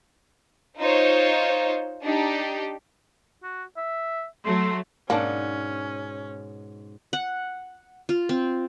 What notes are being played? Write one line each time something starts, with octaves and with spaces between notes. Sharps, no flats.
D#4 F4 C5 C#5
D4 D#4 G4
F#4
E5
F#3 A3 C6
G#2 B2 A#3 C#4 D4 F#5
F#5
F4
C4